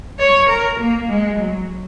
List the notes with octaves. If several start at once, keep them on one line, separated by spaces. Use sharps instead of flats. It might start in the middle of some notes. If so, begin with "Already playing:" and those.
C#5
A#4
A#3
G#3
F#3